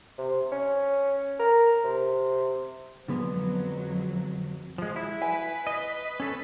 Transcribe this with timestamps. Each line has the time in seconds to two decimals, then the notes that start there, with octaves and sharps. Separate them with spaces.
0.18 C3
0.52 C#4
1.39 A#4
1.83 C3
3.08 F2 D3 F#3 G#3 B3
4.78 F3 G#3
4.96 E4 G#4
5.22 B4 G#5
5.67 D#5
6.20 C#4 A4